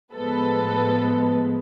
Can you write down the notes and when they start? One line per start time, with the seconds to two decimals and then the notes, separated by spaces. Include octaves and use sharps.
0.13 A2 F3 G#3 B3 A4 B4